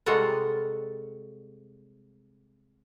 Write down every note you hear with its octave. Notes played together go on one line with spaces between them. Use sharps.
C3 G3 G#3 F#4 A4 A#4